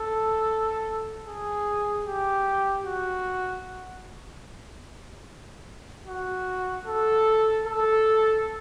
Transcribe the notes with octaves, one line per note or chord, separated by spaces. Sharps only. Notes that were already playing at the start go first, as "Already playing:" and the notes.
Already playing: A4
G#4
G4
F#4
F#4
A4
A4